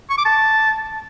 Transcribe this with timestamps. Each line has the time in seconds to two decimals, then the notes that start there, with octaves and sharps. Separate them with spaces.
0.10 C#6
0.17 D6
0.25 A5